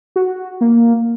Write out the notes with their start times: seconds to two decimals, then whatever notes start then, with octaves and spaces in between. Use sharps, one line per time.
0.16 F#4
0.61 A#3